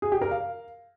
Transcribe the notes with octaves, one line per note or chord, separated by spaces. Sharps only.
G#4
G4
A#4
F5